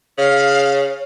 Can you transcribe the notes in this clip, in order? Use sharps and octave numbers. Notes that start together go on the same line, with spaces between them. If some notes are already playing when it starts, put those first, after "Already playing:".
C#3 C#5 F5